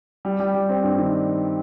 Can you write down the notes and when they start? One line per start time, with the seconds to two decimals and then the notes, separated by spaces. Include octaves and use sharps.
0.25 G3
0.40 G3
0.54 G3
0.69 C4
0.83 G2
0.98 D#3